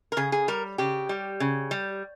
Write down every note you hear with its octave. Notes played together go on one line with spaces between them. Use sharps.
A#4
C#3 G#4
G#4
G3 A#4
C#3 G4
G3
C#3
G3